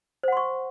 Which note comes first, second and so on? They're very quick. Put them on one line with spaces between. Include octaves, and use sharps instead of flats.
C5 F#5 C6 C#6